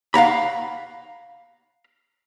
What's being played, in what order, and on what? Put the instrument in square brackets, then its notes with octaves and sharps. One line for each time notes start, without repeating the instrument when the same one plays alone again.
[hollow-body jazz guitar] F5 F#5 A#5 B5